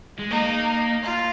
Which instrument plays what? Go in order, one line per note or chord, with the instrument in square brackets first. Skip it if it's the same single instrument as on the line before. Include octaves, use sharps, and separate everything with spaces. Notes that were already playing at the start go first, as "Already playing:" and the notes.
[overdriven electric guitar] G#3
[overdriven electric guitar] A#3 [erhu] D#4
[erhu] F4